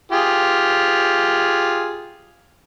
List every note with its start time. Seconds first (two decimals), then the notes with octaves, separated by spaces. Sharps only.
0.12 F4 G4 G#4